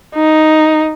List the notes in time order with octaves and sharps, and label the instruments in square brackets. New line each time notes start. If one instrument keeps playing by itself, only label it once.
[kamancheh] D#4